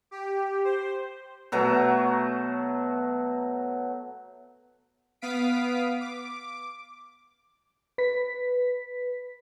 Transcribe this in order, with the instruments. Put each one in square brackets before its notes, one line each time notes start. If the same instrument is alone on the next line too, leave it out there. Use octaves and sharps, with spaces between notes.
[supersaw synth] G4
C5
[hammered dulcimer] B2 F#3 A3 A#5
[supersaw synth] B3 F5 D#6 B6 D7
D6
[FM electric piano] B4 B6